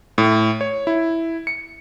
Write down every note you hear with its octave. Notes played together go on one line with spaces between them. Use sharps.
A2
C#5
E4
C#7